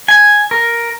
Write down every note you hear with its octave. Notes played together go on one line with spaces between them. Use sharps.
G#5
A#4